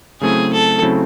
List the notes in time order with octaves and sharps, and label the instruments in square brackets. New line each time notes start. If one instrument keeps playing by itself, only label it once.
[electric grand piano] C#3 F#3 A3 C4 E4 [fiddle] G#4
[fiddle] A4
[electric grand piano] C#3 F#3 A3 C4 E4